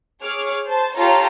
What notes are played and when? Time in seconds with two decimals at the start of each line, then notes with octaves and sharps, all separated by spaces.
0.20 G#4 C#5 D6 F6
0.65 C5 A5
0.96 F4 G4 A4 C#5 A#5